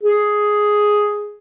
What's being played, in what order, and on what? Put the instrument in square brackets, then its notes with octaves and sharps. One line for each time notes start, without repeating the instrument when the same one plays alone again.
[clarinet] G#4